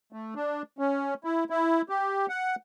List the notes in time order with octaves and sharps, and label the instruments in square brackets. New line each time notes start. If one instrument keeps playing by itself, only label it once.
[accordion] A3
D4
C#4
E4
E4
G4
F#5